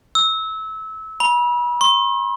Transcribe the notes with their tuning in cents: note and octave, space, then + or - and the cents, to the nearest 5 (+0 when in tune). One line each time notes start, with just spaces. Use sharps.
E6 -25
B5 -35
C6 +45